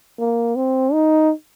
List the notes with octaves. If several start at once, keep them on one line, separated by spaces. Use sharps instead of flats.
A#3
C4
D#4